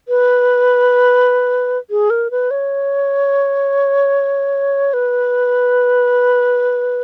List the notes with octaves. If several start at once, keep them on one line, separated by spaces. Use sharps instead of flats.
B4
G#4
A#4
B4
C#5
B4